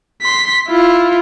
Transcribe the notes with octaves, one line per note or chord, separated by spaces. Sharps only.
C6 B6
E4 F4